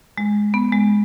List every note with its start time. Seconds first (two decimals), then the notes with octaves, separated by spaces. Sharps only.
0.18 G#3
0.54 B3
0.72 G#3